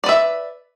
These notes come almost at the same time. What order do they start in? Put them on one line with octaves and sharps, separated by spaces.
D5 B4 E5